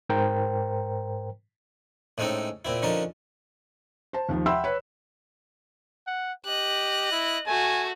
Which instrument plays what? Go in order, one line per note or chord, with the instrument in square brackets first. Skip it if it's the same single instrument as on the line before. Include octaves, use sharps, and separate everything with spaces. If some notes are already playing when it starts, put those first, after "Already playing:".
[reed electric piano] G#2 A#4 C5 G5 A#5
[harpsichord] A2 G#3 C4 C#4 D#4 A4
A#2 C4 E4
D3 F3 C#4 D#4 A#4 A5
[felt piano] C5 A5
D#2 D#3 F3
E5 F#5 G5 B5 C6 E6
B4 C#5
[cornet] F#5
[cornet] G4 [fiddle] D#5 F#6
[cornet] E4
[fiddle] A3 F#4 [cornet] G#5